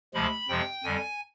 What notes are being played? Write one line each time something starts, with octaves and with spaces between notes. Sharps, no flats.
D2 C3 F3 G#3 B5
F2 C3 F3 G#3 G5
F2 D3 G3 G#5